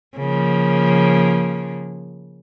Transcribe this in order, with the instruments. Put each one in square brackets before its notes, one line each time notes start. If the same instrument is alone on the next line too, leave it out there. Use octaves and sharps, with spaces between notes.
[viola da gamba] C#3 F3 A#3